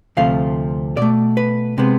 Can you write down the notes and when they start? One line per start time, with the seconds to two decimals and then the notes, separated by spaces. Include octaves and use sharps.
0.17 D2 C3 F3 A3 F5
0.97 B2 A3 D5
1.37 B4
1.78 C3 G#3 B3